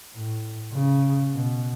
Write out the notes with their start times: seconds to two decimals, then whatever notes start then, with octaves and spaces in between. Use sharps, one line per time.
0.14 A2
0.73 C#3
1.32 B2